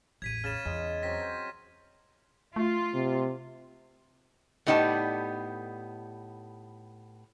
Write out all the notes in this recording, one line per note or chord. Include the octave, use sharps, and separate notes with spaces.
A1 E2 G#6 B6 D#7
C#3 F6 A6 E7
E2 G#3
F#3 C4 A#6 B6
C5
A3 F4
C3
A2 B3 D#4 G4 D5 A5